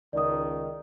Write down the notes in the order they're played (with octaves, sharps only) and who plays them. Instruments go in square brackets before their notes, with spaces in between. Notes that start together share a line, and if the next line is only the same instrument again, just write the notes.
[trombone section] C#2 D#3 [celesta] D5 D#6